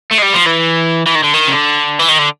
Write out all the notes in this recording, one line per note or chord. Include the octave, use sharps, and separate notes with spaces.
A3
G#3
G3
F3
E3
E3
D#3
D3
D#3
C#3
D3
E3
D#3
D3